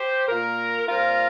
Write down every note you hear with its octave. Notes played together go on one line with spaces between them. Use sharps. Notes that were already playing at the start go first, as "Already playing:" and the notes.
Already playing: G4 C5
A#2 A#3 F4 A#4
A#2 G3 C4 F4 A#4